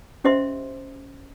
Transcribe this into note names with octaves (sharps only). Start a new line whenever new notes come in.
C#4 G4 C5 D#5 E5 C6